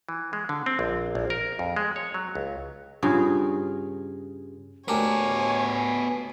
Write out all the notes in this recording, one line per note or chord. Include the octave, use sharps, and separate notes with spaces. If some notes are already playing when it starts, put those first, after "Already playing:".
E3
G#3
D3
C4
A#1
A#1
A#4
F2
G#3
C#5
F#3
C#2
G2 C#3 F4 G#4
D2 B3 G4 A#4 C#5 G#5 A5